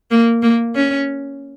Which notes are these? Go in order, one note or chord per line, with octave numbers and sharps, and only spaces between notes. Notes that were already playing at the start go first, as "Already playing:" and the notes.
A#3
A#3
C#4